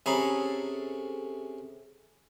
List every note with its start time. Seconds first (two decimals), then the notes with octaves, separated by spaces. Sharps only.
0.06 C3 C#4 G#4 A4 A#5 B5